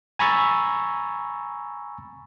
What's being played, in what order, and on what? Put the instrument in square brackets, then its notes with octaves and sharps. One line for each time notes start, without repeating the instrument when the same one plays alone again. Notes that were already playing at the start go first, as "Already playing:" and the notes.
[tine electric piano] G#5 A#5 B5 C#6 E6 A6